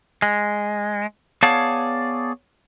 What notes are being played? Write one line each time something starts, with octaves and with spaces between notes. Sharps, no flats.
G#3
B3 G#4 C#5 D5 F5 A5